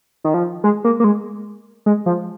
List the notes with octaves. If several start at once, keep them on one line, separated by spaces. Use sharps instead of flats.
D#3
F3
G#3
A#3
A#3
G#3
G#3
F3